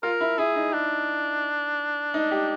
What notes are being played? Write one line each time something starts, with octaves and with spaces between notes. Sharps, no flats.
F4 A#4
E4
E4 G#4
D#4
D4
D#4
G4